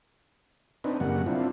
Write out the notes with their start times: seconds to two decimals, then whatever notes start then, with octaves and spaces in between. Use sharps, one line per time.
0.84 C4 D4 D#4 B4
1.00 F#2 C#3 G3 A#3 F#5
1.26 C4 D4 E4 F4